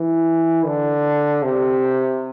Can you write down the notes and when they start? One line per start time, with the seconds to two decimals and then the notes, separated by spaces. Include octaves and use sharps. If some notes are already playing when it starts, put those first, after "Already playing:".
Already playing: E3
0.66 D3
1.43 C3